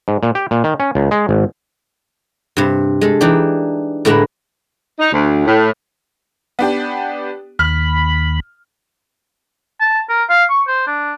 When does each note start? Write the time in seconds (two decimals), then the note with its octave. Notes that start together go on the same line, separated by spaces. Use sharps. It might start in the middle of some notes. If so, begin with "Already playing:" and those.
0.08 G#2
0.23 A#2
0.35 G4
0.51 A#2
0.64 D#3
0.80 C#4
0.95 C#2
1.11 G#3
1.29 G#1
2.57 G2 C3
3.01 G#3 A4
3.21 E3 D4 D#4 G4
4.05 A2 D3 G#3 E4 B4 A#5
4.99 D#4
5.12 D2
5.46 A2
6.59 B3 D4 G4
7.59 D#2 B5 F6
9.80 A5
10.09 A#4
10.29 F5
10.50 C#6
10.68 C5
10.87 D4